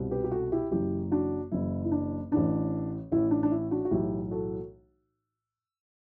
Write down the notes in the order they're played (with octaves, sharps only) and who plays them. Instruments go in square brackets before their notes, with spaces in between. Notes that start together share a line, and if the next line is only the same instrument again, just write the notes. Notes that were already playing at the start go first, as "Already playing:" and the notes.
Already playing: [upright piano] C2 B2
G4 B4
G4
F#4 A4
E4 G4
F#1 F#2 E3 E4 G4
D4 F#4
F#1 F#2 E3 E4
E4
D4
A1 A2 E3 D4
A1 A2 E3 E4
D4
D4
E4
D4 F#4
F#4
B1 A2 E3 E4 G4
F#4 A4